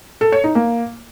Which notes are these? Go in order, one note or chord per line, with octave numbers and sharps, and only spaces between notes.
A4
C#5
D#4
A#3